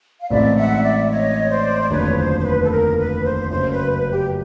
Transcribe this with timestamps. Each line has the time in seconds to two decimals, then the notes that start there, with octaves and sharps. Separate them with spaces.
0.21 F5
0.30 A1 A2 E3 G#3 C4 D5 E5
0.57 E5 F#5
0.84 D5 E5
1.10 C#5 D#5
1.50 C5 D5
1.82 D5
1.90 F1 D#2 D3 F#3 B4 C#5
2.17 C5
2.39 C5
2.44 B4
2.63 A4
2.71 A#4
2.98 B4
3.24 C5
3.50 F#1 F#2 C#3 F#3 C5
3.71 B4
3.90 B4
4.11 G4